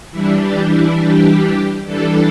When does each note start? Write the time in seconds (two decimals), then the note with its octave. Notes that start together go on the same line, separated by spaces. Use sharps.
0.12 E3 G3 D4 E4
0.40 G4
0.70 E4
0.99 G4
1.85 E3 G3 D4 A4